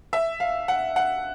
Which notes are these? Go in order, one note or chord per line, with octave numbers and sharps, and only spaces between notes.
E5
F5
F#5
F#5